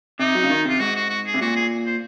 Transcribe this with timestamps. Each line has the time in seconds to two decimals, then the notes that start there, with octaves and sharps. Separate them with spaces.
0.19 C3 D#4
0.35 F#3
0.43 C#3
0.50 D#3
0.65 C3 F4
0.80 G#2 F#4
0.96 F#4
1.10 F#4
1.26 G#4
1.34 C3
1.41 A#2 F#4
1.56 G#4
1.86 C5